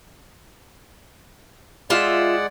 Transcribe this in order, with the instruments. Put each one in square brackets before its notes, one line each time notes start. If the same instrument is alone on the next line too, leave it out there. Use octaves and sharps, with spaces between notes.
[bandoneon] G#3 D5 F#5 [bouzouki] F4 E5